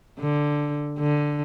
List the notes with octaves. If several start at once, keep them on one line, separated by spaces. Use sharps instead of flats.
D3
D3